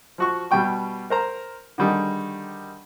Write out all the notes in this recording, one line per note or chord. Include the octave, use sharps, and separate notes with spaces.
F3 F#4 C#6
B2 G3 G5 C#6
A#4 C5 A#5
D3 D#3 G3 D#4 G#4